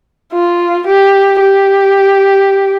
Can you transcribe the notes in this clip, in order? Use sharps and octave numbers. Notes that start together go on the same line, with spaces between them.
F4
G4
G4